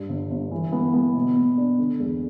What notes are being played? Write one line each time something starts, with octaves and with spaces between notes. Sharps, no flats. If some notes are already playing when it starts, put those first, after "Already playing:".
Already playing: G2
G1
G1
E3
B3
B3
B2
B2
D4
D3
E2